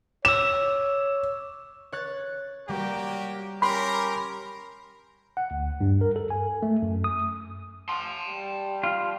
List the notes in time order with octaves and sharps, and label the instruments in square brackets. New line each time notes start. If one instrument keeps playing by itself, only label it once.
[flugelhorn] C#5 [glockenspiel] D6 E6 [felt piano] E7
[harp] C#5 F#6 A6
[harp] G3 [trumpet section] A#3 F#4 G4
[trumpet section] C#4 G4 A#4 [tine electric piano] B5 [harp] C6
[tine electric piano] F#5
D2
G2
A#4
A4
G#5
A3
F#2
D#6
[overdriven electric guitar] A5 C6
[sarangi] G3
[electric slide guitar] F4